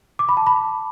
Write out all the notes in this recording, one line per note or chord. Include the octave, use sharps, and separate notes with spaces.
D6
B5
A5
B5